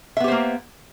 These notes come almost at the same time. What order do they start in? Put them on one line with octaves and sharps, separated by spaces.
E5 B3 G4 C5 A#3